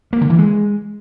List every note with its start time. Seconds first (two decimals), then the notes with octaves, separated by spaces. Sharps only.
0.13 A#3
0.21 D3
0.30 E3
0.38 G#3